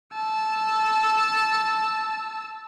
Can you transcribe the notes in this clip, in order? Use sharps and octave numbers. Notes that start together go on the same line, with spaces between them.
A5 E6